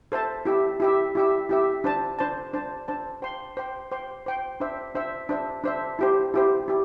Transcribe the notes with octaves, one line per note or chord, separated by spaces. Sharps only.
A4 C5 E5 A5
E4 G4 E5
E4 G4 E5
E4 G4 E5
E4 G4 E5
D4 C5 A5
D4 C5 A5
D4 C5 A5
D4 C5 A5
C5 G5 C6
C5 G5 C6
C5 G5 C6
C5 G5 C6
D4 C5 E5
D4 C5 E5
D4 C5 E5
D4 C5 E5
E4 G4 C5
E4 G4 C5
E4 G4